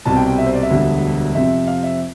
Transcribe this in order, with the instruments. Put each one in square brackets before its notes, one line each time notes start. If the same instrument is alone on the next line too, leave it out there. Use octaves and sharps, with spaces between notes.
[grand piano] C2 B2 G3 C4 A5
G5
G5
E5
C5
D5
E5
E1 D2 D3 G3
F2 C3 F3 C4 E5
F5
E5